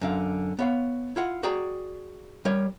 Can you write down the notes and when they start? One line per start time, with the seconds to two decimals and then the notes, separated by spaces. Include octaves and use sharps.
0.01 F#2 D3 F5
0.59 B3 C#5 F5
1.16 E4 F4 F#5
1.43 F#4 G#4 D5 G5 A#5
2.45 G3 A#4 C#5